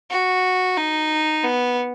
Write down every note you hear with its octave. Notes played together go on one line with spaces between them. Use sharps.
F#4
D#4
B3